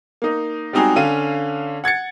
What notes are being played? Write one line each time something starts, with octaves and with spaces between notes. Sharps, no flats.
A#3 D#4
G3 G#3 C4 D#4 F#4 G#4
D3 C#4 F5 D#7
F#5 G#6 A6 C#7